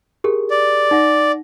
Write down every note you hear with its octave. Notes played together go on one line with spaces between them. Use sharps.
G4 G#4 A#4
D5
D#4 F#5 A#6